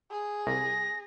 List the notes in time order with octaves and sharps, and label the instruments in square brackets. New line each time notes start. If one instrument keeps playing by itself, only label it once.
[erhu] G#4
[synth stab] C2 [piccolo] A#6